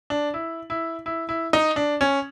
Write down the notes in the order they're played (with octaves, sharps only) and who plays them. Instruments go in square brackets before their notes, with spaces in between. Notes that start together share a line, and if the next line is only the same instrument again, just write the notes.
[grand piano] D4
E4
E4
E4
E4
D#4
D4
C#4